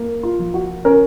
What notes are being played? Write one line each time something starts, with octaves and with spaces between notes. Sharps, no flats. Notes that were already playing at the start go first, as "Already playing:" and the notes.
Already playing: A#3
F4
F3
F#4
C#4 A#4